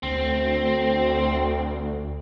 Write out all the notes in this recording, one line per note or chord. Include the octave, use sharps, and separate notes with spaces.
D2 C4